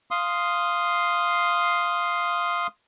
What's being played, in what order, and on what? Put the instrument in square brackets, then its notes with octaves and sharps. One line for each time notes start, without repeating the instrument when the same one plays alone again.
[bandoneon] F5 C6 D#6